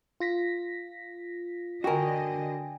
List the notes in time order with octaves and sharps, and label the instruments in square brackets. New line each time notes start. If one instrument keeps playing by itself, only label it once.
[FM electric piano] F4 A#6 B6
[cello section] D3 D4 D#5 [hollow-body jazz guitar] F#4 A#4 [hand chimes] G5 G#5